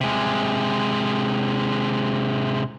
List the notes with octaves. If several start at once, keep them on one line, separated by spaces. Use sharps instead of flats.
C3 G#3